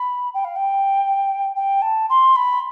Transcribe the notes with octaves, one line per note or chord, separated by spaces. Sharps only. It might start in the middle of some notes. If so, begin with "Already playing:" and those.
Already playing: B5
G5
F5
G5
G5
A5
C6
B5